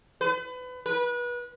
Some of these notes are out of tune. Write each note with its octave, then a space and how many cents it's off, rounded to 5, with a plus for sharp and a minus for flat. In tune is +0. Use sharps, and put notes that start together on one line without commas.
B4 +30
B4 -30